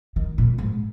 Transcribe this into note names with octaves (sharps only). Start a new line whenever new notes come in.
D#3
A#2
G#2